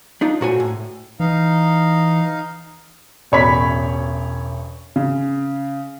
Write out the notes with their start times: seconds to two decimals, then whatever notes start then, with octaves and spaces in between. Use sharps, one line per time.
0.21 D4 D#4 F4
0.41 A#2 A3 F#4 C5 C#5 G#5
0.60 A2
1.20 E3 D#4 F5
3.32 E1 A1 C#5 D5 B5 B6
4.96 C#3